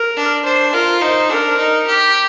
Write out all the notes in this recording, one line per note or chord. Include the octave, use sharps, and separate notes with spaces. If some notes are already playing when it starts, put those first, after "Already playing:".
Already playing: A#4
D4
D4 C5
F4 A#4
D#4 C5
D4 A#4
D#4
G4